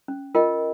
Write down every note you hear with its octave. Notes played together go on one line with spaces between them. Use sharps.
C#4
F4 A#4 D#5 G5